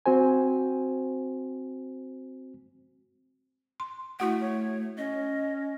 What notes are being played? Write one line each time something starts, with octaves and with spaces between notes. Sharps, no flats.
C4 F#4 C5 G#5
C6
A3 E4 F#4 F#5
C#5
C#4 D#5